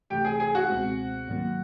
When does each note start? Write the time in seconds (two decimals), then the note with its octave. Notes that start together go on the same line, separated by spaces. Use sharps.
0.10 C2 C3 E3 A3 G4 G5
0.25 G#4 G#5
0.40 G#4 G#5
0.55 F#4 F#5
0.69 C#2 B2 G#3 C4
1.28 G#2 D#3 F#3 A#3